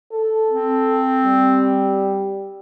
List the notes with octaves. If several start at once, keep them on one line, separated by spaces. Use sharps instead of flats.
A4
C4
G3